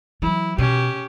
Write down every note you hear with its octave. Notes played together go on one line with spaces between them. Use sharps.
E3 F#3 E4
B2 C#4 G4